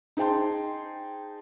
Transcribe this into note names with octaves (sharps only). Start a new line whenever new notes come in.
D#4 G#4 C5 G5 A5 C6